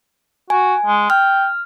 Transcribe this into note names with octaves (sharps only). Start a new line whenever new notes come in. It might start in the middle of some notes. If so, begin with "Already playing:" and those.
F#4 G#5
G#3
G5 F6